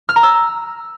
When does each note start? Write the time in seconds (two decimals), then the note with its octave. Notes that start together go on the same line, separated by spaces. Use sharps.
0.09 F6
0.16 A#5
0.23 E6